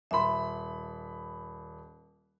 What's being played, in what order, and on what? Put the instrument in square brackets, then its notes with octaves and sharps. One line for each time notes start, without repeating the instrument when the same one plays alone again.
[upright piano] D#1 B5 [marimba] E5 C6